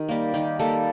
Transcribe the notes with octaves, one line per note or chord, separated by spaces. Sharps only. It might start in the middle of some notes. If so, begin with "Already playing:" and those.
Already playing: D#3 G4
G3 A#3
D#3 G4
G3 A#3 A4